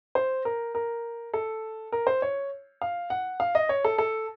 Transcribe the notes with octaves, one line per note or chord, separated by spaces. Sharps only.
C5
A#4
A#4
A4
A#4
C5
C#5
F5
F#5
F5
D#5
C#5
A4
A4